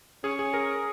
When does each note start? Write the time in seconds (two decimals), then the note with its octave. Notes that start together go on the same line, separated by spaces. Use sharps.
0.24 C#4 G#4
0.39 G#4
0.54 G#4 A#4